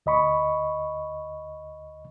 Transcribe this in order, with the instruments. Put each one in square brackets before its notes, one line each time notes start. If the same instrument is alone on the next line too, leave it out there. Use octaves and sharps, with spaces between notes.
[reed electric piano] D2 D#5 B5 C#6